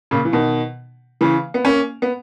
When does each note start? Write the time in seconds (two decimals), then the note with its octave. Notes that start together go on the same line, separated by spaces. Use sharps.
0.11 A#2 C#3
0.25 E3
0.32 B2 D#3
1.21 C#3 E3
1.54 B3
1.65 A#3 C#4
2.02 B3